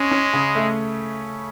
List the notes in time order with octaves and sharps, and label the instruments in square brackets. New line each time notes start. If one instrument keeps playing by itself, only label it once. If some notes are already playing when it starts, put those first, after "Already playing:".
Already playing: [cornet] G#3 [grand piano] C#4
[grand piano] C#4
C#3
A3